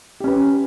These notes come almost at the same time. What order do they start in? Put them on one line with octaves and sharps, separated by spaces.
G4 C#4 B4